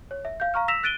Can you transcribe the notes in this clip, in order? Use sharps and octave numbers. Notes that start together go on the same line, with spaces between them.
C#5
E5
F5 G6
F5 A#5 C#6 F6
E6 A#6 B6 E7 F7
F#6 A6 D7 D#7 G7